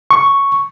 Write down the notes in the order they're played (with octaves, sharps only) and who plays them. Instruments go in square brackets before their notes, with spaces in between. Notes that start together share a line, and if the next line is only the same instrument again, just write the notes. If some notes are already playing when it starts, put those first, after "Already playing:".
[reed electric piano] C#6